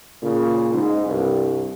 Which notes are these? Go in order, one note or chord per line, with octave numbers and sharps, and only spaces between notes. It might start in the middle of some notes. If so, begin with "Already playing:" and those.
A#2 C#3
G#2
C2 G2